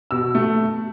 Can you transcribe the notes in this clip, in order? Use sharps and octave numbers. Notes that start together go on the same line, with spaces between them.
B2 E6
A3